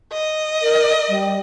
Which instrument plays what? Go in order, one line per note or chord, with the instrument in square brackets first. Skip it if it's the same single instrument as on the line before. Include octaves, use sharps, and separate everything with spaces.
[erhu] D#5
[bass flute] A#4
G3